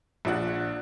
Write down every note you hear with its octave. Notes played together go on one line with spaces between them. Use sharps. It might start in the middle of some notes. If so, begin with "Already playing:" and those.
A#1 F3 D4 F#5 F#6